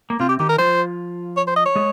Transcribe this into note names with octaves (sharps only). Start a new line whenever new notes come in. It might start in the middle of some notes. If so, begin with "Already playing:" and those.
A#3
C3 C4 F4
G4
D#3 D#4 G4
A#4
F3 F4 C5
C#5
C5
D#5
C#5
G#3 G#4